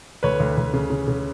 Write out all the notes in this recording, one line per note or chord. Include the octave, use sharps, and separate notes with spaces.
D2 B4 C#5
D2
D2
C#3
C#3
C#3